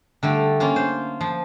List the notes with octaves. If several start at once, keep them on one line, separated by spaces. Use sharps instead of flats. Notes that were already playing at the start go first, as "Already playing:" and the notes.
D3 G3 A3
A#3 C#4 F4
C5
F3